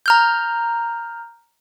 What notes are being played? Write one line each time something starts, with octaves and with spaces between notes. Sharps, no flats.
A#5 F6 G6